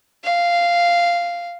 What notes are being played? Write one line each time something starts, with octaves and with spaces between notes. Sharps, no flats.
F5